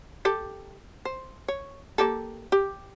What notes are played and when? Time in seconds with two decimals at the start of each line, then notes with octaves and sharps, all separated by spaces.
0.25 G4 A4
1.05 C5
1.48 C#5
1.98 A#3 G4 A4
2.52 G4